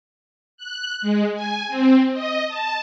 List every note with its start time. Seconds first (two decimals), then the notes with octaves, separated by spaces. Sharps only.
0.57 F#6
1.02 G#3
1.34 G#5
1.68 C4
2.13 D#5
2.48 A5